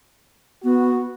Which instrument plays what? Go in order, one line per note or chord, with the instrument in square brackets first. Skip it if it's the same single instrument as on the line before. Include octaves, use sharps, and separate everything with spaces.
[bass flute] B3 [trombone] F#4